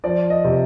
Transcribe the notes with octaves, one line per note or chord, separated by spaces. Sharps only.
F3 D5
D#5
C3